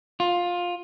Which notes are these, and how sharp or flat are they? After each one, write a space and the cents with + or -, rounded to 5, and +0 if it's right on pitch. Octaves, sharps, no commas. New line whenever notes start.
F4 +15